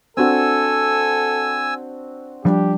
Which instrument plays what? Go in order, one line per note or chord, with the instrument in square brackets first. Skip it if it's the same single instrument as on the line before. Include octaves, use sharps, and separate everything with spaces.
[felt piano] C4 D4 F#4 [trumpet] A4 [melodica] G#5 E6
[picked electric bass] F3 G3 [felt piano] D4 [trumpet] G4